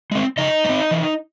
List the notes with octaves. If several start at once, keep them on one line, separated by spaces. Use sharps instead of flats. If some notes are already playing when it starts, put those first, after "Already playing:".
G#3 C4
C#3 D#4 D#5
G#3
C4
E3